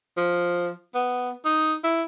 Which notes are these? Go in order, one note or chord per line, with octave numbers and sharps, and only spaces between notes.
F3
B3
D#4
E4